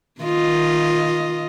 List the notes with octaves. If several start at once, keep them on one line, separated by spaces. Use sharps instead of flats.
D#3 F4 D#5